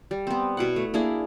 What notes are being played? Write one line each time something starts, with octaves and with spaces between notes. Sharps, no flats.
G3
B3 C4
B2 E4 F#5
A3
A#3 D4 E4 G#4